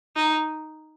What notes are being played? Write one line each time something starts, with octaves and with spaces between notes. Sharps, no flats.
D#4